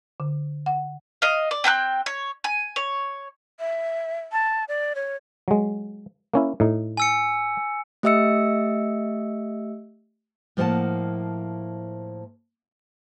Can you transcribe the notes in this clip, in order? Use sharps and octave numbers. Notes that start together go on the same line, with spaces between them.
D3
F#5
D#5 F5
D5
C4 G5 B5 F#6
C#5
G#5
C#5
E5
A5
D5
C#5
F#3 G#3
A#3 C#4 E4
A2 D#4
G#5 E6 C#7
A3 G4 D#5 E5 E6 C#7
A2 F3 A#3 C5 F#5 A5